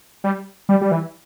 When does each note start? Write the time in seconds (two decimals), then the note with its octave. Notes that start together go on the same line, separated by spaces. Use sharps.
0.24 G3
0.69 G3
0.81 G3
0.91 E3